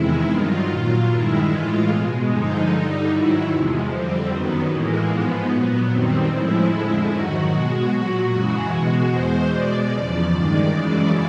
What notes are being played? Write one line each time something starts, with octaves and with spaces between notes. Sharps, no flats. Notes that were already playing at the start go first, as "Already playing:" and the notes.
Already playing: E2 C3 D#3 G#3 E4
G2 D#3 F#3 F4
A#2 F#3
G2 D#3 G#3 E4
A2 E3 G#3 F4
B2 G#3
G2 D3 F3 G#3 D#4
G2 D3 G3
G#2 D#3 F#3 E4
E2 C3 F3 G#3
F2 D3 G3 C4
F#2 D#3 F#3 B3
A2 E3 G#3 A#3
G#2 F3 G#3 B3
A#2 F#3
F#2 D#3 G3 C4
A2 F3 G#3 E4
F2 D3 F3 G#3
G#2 D#3 F#3 F#4
B2 G#3
A#2 F#3 F#4
F#2 C#3 E3 G#3
B2 G#3
E2 B2 G#3 C5
B2 G#3 D5
E2 C#3 F3
G2 D#3 G#3
F#2 C#3 E3 G#3